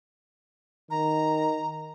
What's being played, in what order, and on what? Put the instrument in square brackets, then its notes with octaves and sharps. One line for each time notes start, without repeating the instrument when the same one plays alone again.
[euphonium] D#3 [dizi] A#5